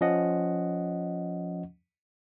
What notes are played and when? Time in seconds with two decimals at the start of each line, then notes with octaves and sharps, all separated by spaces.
0.01 F3 C#4 D#5 F#5